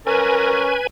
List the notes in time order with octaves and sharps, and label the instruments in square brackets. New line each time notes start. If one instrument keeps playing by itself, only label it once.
[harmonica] C#4 A#4 [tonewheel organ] B4 G#5